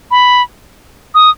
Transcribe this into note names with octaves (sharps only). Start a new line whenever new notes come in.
B5
D#6